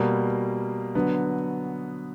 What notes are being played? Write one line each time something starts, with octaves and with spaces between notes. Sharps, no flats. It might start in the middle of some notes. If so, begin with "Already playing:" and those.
Already playing: B2 G3 A#3
D3 F#3 B3